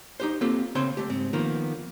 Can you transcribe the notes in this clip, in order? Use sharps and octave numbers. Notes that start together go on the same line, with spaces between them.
D#4 G4 C5
A#3 C4 F4 G4 A4
C#3 C4 C5 C#5 C6
A3 G4
G#2 C4
D#3 F3 A#3 B3